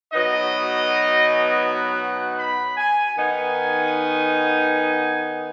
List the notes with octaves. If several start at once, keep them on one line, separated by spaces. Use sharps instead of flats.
B2 F#3 B3 D#4 D#5
F#5
B5
G#5
D#3 B3 D#4 G#5